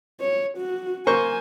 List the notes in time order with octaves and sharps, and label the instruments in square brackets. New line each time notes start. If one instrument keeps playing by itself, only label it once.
[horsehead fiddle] C#5
F#4
[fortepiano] A#3 C5 C#6 [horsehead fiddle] G#5